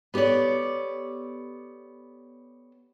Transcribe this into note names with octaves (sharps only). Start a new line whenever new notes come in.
B3 G4 A4 C#5 D5